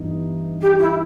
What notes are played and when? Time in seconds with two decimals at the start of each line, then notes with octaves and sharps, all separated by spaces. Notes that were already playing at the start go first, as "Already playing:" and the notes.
Already playing: G2 E3 B3 D#4
0.61 G4
0.78 E4